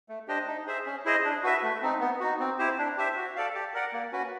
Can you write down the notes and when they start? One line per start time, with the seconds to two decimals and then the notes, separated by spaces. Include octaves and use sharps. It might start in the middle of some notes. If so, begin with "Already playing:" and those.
0.09 A3
0.28 D4 G4 C5 D#5
0.47 D#4
0.67 G#4 C5 E5
0.86 C#4
1.05 E4 G#4 C5 D#5
1.24 D4
1.43 F#4 B4 E5
1.63 A3
1.82 C4 D#4
2.01 B3
2.20 D#4 F#4
2.40 C4
2.59 E4 G4 C5
2.79 D4
2.98 G4 C5 E5
3.17 F#4
3.36 A4 D5 F5
3.55 G4
3.74 A#4 D5 F#5
3.93 A#3
4.12 C#4 F#4 B4